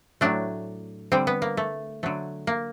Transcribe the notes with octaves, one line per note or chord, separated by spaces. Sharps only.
A2 F#3 A3 D4
D3 G3 C4
B3
A#3
A3
D3 F#3 A3
A#3